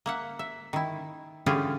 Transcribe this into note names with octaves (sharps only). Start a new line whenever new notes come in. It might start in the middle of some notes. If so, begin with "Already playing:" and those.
A#3 E5 F#5
E5
D#3 E4
D3 E3 C#4 F4 G4 G#4